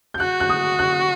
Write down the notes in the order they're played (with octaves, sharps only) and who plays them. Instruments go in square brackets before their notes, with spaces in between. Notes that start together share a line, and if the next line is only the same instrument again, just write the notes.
[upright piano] G6
[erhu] F#4 [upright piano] F#6
[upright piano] F#6
D#6
F#6